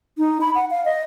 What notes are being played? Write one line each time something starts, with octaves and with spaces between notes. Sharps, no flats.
D#4
B5
F#5
F5
D#5